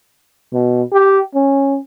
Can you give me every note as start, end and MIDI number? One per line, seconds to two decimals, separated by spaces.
0.53 0.83 47
0.93 1.21 67
1.35 1.78 61